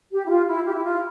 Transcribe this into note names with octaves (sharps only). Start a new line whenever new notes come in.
G4
E4
F4
E4
G4
E4
F4